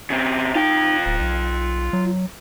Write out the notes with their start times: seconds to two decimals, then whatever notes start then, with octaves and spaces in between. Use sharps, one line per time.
0.10 C#3 C4
0.55 D#4 F4 G5
1.06 D1
1.20 B1
1.93 F#3